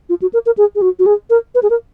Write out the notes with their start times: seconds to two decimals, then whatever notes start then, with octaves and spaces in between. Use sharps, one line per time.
0.09 F4
0.22 F#4
0.33 A#4
0.46 A#4
0.57 G#4
0.75 G#4
0.82 F#4
0.99 F#4
1.06 G#4
1.30 A#4
1.55 B4
1.63 G#4
1.70 A#4